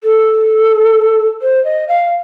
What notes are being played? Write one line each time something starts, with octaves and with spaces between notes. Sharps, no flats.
A4
C5
D#5
F5